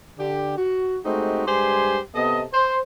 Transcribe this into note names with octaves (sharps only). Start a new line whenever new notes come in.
D3 G4
F#4
G#3 A3 C4 D#4 F#4 G4
G2 G#3 G4 C5 G#5 C6
C3 B3 A4 D#5
C5